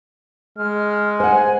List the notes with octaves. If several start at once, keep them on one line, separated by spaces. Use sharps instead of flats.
G#3 F6
C5 F#5 G#5